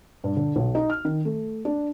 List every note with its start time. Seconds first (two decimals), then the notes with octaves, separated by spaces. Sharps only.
0.24 G2
0.36 D3
0.56 B1
0.75 D#4
0.90 F6
1.05 D#3
1.25 A3
1.65 D4